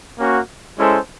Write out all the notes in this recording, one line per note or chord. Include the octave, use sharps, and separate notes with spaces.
A#3 C#4 F#4
G#3 C#4 E4 A4 C5